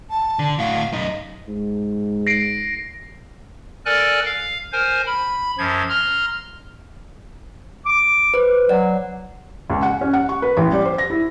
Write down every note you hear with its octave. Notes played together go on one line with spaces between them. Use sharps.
A5
D3
A2 F#4 F5
F#2 D#4
G#2
A#6 C7 D7
A4 A#4 D5 G#5 F#6
F5
A#4 C5 G#5
B5
F#2 F3 G#6
A#5 C6 F6
D6
B4 C5
F#3 D5 F#5
C#2
F#5
C#4
F#5
C#6
B4
A1
G3
C5
A#6
E4